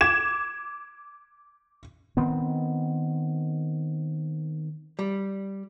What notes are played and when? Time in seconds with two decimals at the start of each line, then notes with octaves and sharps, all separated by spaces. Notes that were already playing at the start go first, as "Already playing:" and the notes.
0.01 D6 G#6 E7
2.17 D#3 B3 C4
4.99 G3